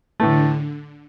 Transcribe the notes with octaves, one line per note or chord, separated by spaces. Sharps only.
A2 D3 E3 A3